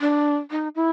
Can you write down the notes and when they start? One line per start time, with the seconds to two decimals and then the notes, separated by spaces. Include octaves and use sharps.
0.01 D4
0.51 D#4
0.75 E4